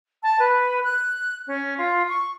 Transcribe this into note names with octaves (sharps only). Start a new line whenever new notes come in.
A5
B4
F#6
C#4
F4
C#6